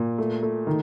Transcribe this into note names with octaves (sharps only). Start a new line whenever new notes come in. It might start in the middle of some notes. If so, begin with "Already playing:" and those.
Already playing: A#2
A3
A3
D#3